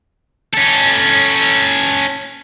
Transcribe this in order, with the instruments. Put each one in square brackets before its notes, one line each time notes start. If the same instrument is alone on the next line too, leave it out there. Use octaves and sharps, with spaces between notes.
[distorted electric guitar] C#4 A4